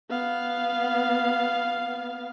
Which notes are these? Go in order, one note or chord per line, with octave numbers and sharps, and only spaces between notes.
B3 F5